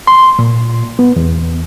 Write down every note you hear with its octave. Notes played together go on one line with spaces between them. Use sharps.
C6
A#2
B3
E2